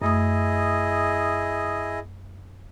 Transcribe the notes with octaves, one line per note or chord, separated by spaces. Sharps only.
F#2 A3 E4 G#4 D#5 D#6